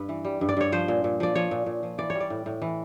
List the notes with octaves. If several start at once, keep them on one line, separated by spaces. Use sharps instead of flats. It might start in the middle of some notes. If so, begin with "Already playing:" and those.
Already playing: G2 B4
E3
G3
G2
D5
G2 C#5
F3 C5
A#2
A#2
F3 D5
F3 C#5
A#2
A#2
F3
E3 D5
G3 C#5
D5
A2
A2
E3